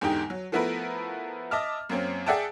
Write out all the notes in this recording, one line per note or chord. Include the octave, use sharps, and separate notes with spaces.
E2 G#2 D3 D#4 G4 G5
F#3
F3 A3 B3 E4 A#4 B4
D#5 E5 A5 D6 F6
F#2 A#3 C4 C#4
G#4 D5 E5 F#5 G5 A5